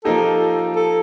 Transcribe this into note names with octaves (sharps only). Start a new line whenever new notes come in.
F3 A#3 D#4 G4 A4
A4